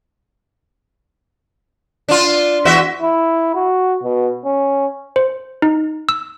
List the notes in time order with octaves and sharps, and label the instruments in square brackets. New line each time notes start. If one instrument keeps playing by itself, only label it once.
[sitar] D4 F4
E2 F#4 E5
[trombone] E4
F#4
B2
C#4
[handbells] C5
D#4
E6